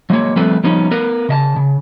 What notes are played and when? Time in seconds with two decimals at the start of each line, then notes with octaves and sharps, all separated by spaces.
0.10 F#3 G#3 A#3 C#5
0.36 F3 G3 A3 C4 A4 B4
0.64 F3 G3 B3 C#4 D#4
0.91 B3 A#4 B4
1.29 C#3 D#5 A5
1.56 C#3